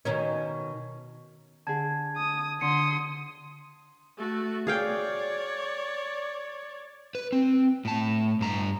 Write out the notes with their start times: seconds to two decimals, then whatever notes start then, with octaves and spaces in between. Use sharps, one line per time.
0.05 B2 D#3 C#4
1.67 D3 G#4 A5 G#6
2.17 D#6
2.61 D3 C6 D#6 C#7
4.18 A3 F#4
4.67 G#4 C#5 D5 F5 G5
7.15 B4
7.32 C4
7.85 A2 A5
8.41 G2 A#5